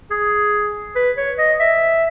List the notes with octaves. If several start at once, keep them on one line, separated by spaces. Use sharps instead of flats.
G#4
B4
C#5
D#5
E5